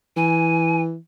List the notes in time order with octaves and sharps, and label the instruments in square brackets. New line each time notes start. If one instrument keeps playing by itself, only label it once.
[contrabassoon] E3 [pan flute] G#5